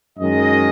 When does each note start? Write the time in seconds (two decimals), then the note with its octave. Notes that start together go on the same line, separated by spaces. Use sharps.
0.18 F#2 D#3 G#3 D#5